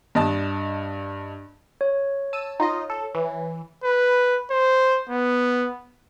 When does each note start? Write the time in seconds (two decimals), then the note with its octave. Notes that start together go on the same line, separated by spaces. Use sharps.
0.15 G2 D#5 A5
1.81 C#5
2.33 A5 E6 D#7
2.60 D#4 F4 D#5
2.90 A4
3.15 E3
3.84 B4
4.51 C5
5.10 B3